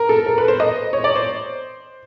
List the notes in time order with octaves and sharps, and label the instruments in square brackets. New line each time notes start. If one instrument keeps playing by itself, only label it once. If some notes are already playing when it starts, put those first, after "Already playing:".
Already playing: [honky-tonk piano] A#4
A4
A#4
B4
C5
D#5
C#5
D5
C5